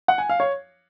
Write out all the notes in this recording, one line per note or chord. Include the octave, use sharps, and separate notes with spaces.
F#5
G#5
F5
C#5